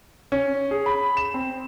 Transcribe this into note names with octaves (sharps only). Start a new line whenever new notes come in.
C#4
G#4
B5
E7
C4